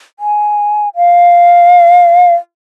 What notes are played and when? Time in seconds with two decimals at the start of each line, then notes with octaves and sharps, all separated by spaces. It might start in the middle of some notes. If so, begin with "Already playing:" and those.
0.20 G#5
0.96 F5